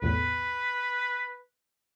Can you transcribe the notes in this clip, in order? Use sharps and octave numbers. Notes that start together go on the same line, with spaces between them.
B1 E2 A2 B4